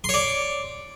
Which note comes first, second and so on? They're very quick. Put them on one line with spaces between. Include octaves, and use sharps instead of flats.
C6 C#5 D5